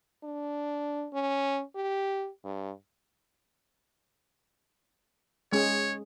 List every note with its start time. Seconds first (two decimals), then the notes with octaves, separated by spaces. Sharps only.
0.24 D4
1.13 C#4
1.75 G4
2.44 G2
5.52 G#3 C#4 G#4 C#5